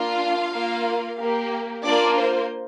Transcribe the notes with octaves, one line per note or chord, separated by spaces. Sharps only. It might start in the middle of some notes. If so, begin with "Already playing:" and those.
Already playing: A#3 D4 F4 F5
A#3 F4
A#3 G4
A#3 D4 F4 D5
C5